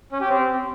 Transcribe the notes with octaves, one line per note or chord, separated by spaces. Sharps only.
C#4
G4
C4